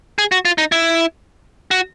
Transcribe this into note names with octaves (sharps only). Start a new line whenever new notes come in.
G#4
F#4
F4
D#4
E4
F#4